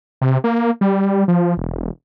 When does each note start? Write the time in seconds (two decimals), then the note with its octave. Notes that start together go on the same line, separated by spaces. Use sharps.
0.21 C3
0.44 A#3
0.81 G3
1.28 F3
1.57 E1